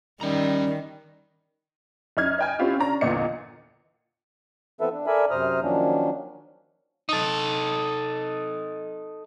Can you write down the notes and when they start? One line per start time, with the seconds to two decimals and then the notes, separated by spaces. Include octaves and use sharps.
0.21 D#3 G3 C#4 A#5
2.17 F#2 D#4 F6 G#6
2.39 D#5 G5 G#5
2.59 C4 C#4 E4 F4 G4
2.79 C#4 D4 A#5
3.01 G1 E2 A#2 D#5 C#7
4.81 E3 B3 C4 A4 B4 E5
4.92 D4
5.07 A4 A#4 D5 E5 G#5 B5
5.31 F#2 C3 C5 A#5 D#6 F6
5.62 D#3 F3 F#3 A#3 C#4 D4
7.09 D#4 A4